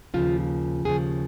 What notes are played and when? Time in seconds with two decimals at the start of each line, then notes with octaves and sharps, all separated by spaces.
0.14 D#2 C#3 F3 F4
0.85 D#2 C#3 F3 G#4